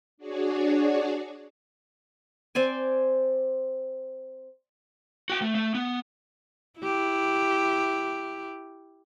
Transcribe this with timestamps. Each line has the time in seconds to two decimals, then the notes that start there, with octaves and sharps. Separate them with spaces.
0.18 D4 F#4 G#4 C#5 D5
2.55 C4 C5 D5 G#5
5.30 F#4 G5
5.42 A3
5.55 A3
5.75 B3
6.80 E4 G4